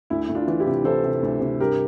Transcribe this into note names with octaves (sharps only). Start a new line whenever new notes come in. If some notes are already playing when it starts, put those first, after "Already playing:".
D2 E4
D2
D4 F4
E3
E4 G4
C3
E3 A4 C5
C3
D2
C3
G2 G4 A#4